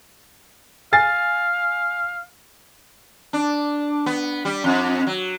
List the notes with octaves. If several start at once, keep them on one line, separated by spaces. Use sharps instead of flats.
F5 G#5 A6 C7
D4
B3
G3
F2
F#3